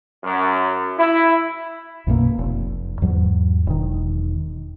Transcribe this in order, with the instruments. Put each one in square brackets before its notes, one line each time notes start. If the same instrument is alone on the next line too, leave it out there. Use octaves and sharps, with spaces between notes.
[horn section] F#2
E4
[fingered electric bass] B1 F#2 B2 A#3
F1
E2 G#2 F#3
E1 D#3